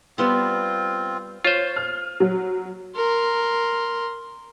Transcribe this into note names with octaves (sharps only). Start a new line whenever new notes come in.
G3 B3 C4 F4 C6
F4 C5 C#5
F6
F#3
A#4 C6